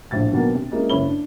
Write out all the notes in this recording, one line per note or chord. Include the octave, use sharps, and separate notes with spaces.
A#1 A2 A6
B2 D#3 F#3 A#3 B3
C3
G#3 A#3 C#4 E4
F#1 C#2 E4 C#5 B5 G7
D4